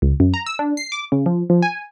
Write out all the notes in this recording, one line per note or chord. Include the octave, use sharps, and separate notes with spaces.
C#2
F#2
A#5
E6
D4
C7
D6
C#3
F3
F3
G#5